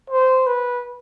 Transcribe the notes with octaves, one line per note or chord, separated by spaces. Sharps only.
C5
B4